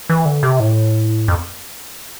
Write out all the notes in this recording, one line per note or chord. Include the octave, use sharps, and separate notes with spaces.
E3
D3
C3
A2
F2